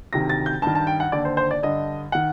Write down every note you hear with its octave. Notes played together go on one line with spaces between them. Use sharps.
D2 C3 D#3 A#6
A6
G6
G2 D#3 A5
A5
G5
F#5
D#2 D3 D5
C5
C5
D5
G2 D3 D#5
D#3 F#5